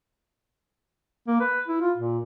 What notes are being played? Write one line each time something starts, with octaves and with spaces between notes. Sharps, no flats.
A#3
B4
E4
F4
A#2